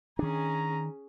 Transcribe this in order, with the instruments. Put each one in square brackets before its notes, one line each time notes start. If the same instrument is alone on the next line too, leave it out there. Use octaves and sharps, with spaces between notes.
[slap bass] D#3 D4 [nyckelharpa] C#4 G#4 [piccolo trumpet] A#5